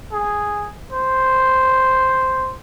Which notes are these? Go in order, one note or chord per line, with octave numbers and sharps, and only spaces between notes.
G#4
C5